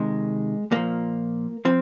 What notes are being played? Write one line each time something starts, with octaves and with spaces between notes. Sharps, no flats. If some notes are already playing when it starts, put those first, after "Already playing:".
Already playing: C3 D#3 G#3
A#2 F3 A#3
F3 C4